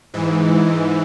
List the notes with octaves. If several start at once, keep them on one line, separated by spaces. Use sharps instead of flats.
G#2 E3